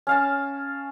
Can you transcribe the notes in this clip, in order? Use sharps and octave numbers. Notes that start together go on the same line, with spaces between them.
C#4 F5 A5